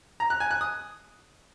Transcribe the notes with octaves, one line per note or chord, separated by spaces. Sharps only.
A#5
F#6
G#5
F#6
D#6